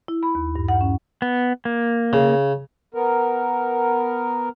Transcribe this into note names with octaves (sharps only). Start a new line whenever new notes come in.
E4
B5
D#2
G2
F#5
C#4
B3
A#3
C#3
B3 A#4